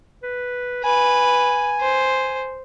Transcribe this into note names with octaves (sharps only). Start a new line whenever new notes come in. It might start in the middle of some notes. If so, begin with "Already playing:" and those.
B4
B4 G#5
C5